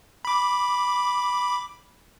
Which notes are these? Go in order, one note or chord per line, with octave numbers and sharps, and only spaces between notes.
B5 D6